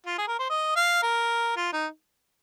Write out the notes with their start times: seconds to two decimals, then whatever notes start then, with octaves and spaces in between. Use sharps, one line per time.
0.06 F4
0.18 G#4
0.28 A#4
0.39 C5
0.50 D#5
0.76 F5
1.02 A#4
1.56 F4
1.73 D#4